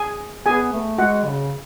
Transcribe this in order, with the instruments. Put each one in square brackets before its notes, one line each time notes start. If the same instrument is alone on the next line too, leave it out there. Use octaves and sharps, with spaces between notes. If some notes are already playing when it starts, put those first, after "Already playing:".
Already playing: [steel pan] G#4 G#5
[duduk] B3 [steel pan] G#4 G#5
[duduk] A3
[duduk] G#3 [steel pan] F#4 F#5
[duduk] C#3